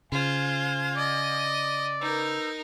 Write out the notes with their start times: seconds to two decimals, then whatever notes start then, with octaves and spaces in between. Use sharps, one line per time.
0.12 C#3 F4 C5 F5 G#5 G#6
0.97 D5 D#5
2.01 D#4 A#4 B4 E6 G6